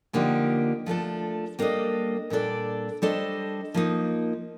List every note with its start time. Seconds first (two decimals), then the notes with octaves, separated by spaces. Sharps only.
0.13 D3 F3 A#3 D#4 G4
0.86 F3 A3 D4 A4
1.59 G3 A#3 D4 A4 D#5
2.30 A#2 G3 D4 A4 D5
3.02 G3 D4 A4 C5 D#5
3.74 F3 A#3 D#4